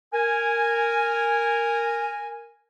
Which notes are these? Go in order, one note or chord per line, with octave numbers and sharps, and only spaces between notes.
A#4 G#5